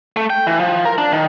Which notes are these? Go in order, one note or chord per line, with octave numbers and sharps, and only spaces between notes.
A3
G5
E3
F3
A#4
D4
D#3